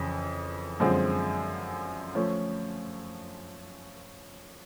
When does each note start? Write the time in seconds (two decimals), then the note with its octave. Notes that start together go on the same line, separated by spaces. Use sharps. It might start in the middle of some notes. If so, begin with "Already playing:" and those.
Already playing: F2 C#3 E3
0.80 F#2 D3 F3 G#3 C4
2.15 F3 A3 C#4